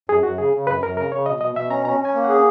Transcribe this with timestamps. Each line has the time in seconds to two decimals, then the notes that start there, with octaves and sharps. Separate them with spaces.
0.09 F#2 G#4
0.23 F#2 F#4
0.38 C#3 G#4
0.53 C#3
0.67 F#2 B4
0.83 F#2 A#4
0.97 C#3 A#4
1.11 C#3 C#5
1.26 B2 D#5
1.41 B2 D#5
1.55 B2 E5
1.70 C#4 A#5
1.85 C#4 A#5
2.00 C#4 G#5
2.14 A#3
2.24 G#4 F#5